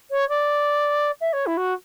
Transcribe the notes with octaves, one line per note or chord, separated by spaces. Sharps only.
C#5
D5
E5
C#5
E4
F#4